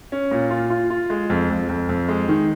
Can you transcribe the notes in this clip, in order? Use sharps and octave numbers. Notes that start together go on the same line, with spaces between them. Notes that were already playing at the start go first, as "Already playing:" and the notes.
C#4
A#2
F4
F4
F4
G#3
F2
F2
F2
F2
G#3
D#3